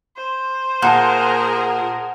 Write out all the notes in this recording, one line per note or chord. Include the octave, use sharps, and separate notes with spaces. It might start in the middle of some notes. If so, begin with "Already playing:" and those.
C5
A#2 G#4 A#4 F#5 A5